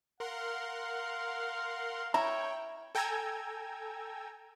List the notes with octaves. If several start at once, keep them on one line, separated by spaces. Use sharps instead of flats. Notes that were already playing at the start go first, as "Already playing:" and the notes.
A#4 F5 F#5 C6
E4 C#5 G5 A#5
A4 G5 G#5 A#5 E6 G#6